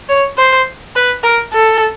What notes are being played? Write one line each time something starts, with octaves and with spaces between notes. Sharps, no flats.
C#5
C5
B4
A#4
A4